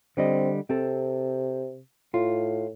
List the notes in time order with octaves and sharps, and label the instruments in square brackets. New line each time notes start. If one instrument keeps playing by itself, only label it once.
[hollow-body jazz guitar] D3 G3 D#5 [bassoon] C4
[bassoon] C3 [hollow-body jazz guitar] C4 A4
[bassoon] A2 [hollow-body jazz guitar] F4